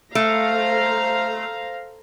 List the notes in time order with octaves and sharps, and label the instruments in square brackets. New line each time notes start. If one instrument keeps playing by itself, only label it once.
[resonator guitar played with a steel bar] A3 [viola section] C5 F5 A#5